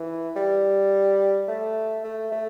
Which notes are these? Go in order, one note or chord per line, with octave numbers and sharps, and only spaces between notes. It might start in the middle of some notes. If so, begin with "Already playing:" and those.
Already playing: E3
G3
A3
A3
A3